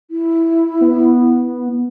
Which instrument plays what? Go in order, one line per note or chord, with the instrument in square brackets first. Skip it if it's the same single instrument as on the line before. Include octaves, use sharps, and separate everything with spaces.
[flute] E4
[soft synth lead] B3